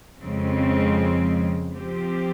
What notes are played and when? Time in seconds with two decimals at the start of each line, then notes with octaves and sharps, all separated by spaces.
0.22 F2 C#3 G#3 C4
1.74 F3 C4 G4